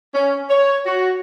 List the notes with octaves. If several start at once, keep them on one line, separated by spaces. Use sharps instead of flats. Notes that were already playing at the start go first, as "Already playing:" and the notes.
C#4
C#5
F#4